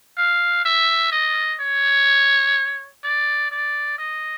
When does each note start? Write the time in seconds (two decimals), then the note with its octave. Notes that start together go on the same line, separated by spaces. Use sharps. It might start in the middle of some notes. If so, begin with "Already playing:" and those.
0.17 F5
0.65 E5
1.12 D#5
1.60 C#5
3.04 D5
3.51 D5
3.98 D#5